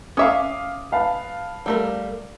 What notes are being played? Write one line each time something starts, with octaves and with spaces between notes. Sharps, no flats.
C#4 E5 F5 D6 D#6
B4 F5 A5
G3 A3 A#4